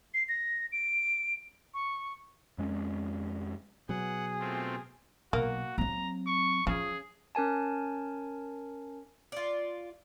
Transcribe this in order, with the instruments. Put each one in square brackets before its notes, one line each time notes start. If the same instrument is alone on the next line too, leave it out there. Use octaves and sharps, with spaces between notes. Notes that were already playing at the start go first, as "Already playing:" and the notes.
[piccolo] C7
A#6
D7
C#6
[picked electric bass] F2 G#3 C#4
[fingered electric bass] B2 F#3 B3 [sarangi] G#4 [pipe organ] F#5
[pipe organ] A3 C4 F4
[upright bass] B1 [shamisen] A#3 [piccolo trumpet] F#4
[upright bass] F#3 C4 [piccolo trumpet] A#5
[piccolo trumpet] C#6
[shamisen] C#3 [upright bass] F3 C#4 [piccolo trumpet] G#4
[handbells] C#4 A#4 G#5 A5
[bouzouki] F4 D5